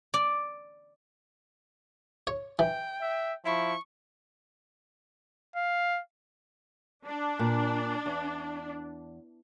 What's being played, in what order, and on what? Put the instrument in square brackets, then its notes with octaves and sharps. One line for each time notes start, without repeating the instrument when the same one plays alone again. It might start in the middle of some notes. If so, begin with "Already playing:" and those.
[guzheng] D5
[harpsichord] C#5
[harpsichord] E3 [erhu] G5
[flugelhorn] E5
[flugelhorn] F3 [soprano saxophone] E4 [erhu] C#6
[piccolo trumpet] F5
[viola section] D4
[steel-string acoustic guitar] A#2
E2